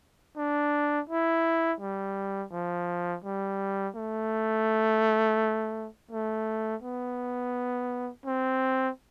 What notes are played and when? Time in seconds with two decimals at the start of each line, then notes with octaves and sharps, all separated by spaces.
0.37 D4
1.09 E4
1.80 G3
2.52 F3
3.24 G3
3.95 A3
6.11 A3
6.82 B3
8.25 C4